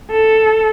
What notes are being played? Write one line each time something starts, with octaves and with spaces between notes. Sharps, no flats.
A4